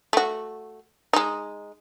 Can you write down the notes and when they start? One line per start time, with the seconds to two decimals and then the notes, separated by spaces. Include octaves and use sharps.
0.13 A3 F#4
1.13 G#3 D#4